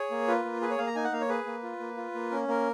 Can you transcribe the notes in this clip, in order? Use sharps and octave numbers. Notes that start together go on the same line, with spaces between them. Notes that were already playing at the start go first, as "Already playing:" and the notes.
Already playing: G#4 C#5
A#3
F4 B4
A#3
G#4 B4
C#5
A#3 F5
A#5
D#4 G#5
F#5
A#3 F5
C#5
G#4 B4
A#3
F4
A#3
F4
A#3
C#4 A#4
A#3 A#4